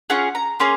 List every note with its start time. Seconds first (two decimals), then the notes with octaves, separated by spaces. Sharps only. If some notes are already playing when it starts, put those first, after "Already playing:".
0.10 C#4 F4 G#4 F#5
0.35 A#5
0.60 A#3 C#4 G#4 C6